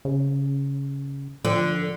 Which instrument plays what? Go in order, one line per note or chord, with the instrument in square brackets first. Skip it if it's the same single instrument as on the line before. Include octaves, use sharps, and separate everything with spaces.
[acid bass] C#3
[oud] D3 [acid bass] F3